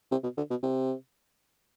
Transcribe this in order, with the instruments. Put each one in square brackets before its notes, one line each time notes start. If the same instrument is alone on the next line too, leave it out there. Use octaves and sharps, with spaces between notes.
[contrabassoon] C3
B2
D3
B2
C3